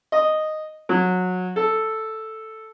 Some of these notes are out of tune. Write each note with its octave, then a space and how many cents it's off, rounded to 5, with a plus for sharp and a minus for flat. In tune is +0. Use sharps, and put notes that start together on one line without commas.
D#5 -5
F#3 -20
A4 +0